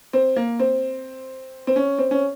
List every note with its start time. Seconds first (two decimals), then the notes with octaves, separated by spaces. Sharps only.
0.13 C4
0.36 A#3
0.60 C4
1.67 C4
1.76 C#4
1.98 C4
2.11 C#4